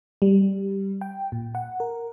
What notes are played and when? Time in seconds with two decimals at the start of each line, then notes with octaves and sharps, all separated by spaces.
0.22 G3
1.01 G5
1.32 A#2
1.55 F#5
1.80 A#4